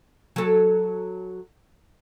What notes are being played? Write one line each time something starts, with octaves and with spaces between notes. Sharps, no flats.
F#3 A4